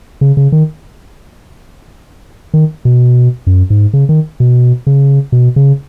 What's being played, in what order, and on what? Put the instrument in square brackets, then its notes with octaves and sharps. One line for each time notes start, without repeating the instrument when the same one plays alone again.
[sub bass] C#3
C#3
D#3
D#3
B2
F#2
G#2
C#3
D#3
B2
C#3
B2
C#3